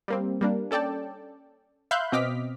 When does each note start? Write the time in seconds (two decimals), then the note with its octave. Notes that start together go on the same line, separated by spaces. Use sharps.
0.08 G3 A#3 C4
0.41 G3 A#3 D4
0.71 C#4 A4 D5 G5 A5
1.91 E5 F5 B5 C6 F#6 G6
2.12 B2 C4 D#5 D6 F6 B6